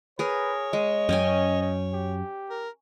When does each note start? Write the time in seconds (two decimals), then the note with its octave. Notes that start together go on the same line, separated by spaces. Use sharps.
0.19 G#4 A#4 B4 C#5
0.73 G#3 D#5
1.09 F#2 C#4 G5 G#5
1.62 C#5
1.94 G4
2.50 A#4